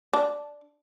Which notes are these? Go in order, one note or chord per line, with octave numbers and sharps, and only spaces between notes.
D4